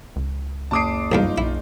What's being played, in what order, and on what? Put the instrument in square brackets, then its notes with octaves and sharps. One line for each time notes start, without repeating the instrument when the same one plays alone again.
[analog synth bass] C#2
[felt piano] F#1 D6 C7 [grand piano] A5 D#6 D7
[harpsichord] B1 E2 G2 [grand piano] D#4 F4
[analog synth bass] B1 [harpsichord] E4